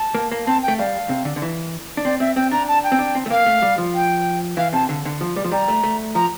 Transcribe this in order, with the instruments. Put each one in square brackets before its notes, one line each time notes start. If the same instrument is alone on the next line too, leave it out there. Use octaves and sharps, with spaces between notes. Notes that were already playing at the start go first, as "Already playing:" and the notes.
Already playing: [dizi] A5
[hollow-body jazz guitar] A#3
A#3
[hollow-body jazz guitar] C4 [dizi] A5
[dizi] G5
[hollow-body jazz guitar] A3
[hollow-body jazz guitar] G3 [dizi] F5
[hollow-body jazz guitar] C3
D3
D3
E3
D4
[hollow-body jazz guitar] C4 [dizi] D5
[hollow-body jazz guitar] C4 [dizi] E5
[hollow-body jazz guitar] C4 [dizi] G5
[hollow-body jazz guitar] D4 [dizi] A#5
[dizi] A5
G5
[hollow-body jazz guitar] C4
D4
C4
A3
[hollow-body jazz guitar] A#3 [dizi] F5
[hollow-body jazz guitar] A3
G3
F3
[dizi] G5
[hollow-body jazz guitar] E3 [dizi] F5
[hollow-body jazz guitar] C3 [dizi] A5
[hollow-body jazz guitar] D3
D3
F3
G3
F3
[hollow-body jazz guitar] G3 [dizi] A#5
[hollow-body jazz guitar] A3
A3
[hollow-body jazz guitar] F3 [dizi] A#5